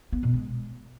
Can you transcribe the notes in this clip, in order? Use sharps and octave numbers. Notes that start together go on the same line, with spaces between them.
B3
B2
G#3